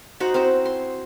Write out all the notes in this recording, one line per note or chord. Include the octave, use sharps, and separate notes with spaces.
D#4 F#4 C5 F#5
C4 E4 C5
C6